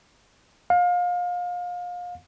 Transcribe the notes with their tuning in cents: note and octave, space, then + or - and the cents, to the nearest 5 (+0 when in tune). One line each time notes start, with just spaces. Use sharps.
F5 +30